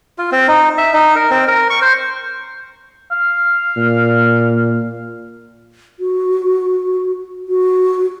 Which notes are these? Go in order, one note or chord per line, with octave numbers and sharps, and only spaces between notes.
F4
C4
D#4
E5
D#4
A#4
C4
A#4
C#6
C5
F5
A#2
F#4
F#4